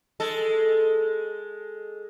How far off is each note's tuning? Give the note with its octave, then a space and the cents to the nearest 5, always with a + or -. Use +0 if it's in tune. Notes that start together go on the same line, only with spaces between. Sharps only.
G#3 +0 A4 +0